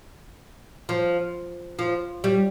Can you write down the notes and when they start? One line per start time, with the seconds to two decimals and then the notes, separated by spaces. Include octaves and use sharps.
0.89 F3
1.79 F3
2.24 G3